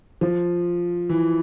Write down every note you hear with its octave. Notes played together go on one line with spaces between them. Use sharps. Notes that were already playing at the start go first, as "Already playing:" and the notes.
F3
E3